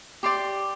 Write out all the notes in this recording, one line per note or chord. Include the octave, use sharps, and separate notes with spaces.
G4 D5 C6